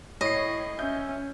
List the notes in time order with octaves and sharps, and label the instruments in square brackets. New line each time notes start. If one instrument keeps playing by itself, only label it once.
[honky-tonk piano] A2 C7 [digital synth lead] C#5 [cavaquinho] D#5
[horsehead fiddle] C#4 [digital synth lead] E5 [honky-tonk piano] G6